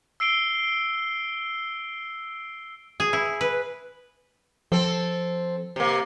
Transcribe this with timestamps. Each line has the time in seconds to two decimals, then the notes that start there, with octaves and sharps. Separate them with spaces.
0.20 E6 C7 D7 G7
3.00 G#4
3.13 E4
3.41 B4
4.72 F3 C4 A4
5.76 C3 A#3